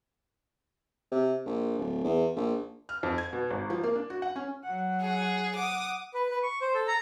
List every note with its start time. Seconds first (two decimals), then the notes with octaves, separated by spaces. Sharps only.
1.12 C3
1.45 A#1
1.78 D1
2.04 E2
2.36 A#1
2.89 F6
3.03 F2
3.18 G#6
3.33 B2
3.51 G#1
3.70 F3
3.83 A#3
3.95 D4
4.10 F#4
4.22 F#5
4.36 C#4
4.64 F#3 F#5
5.01 G#4
5.56 F#5 D6 D#6
6.14 B4
6.30 B4
6.43 C#6
6.61 C5
6.74 A4
6.87 A#5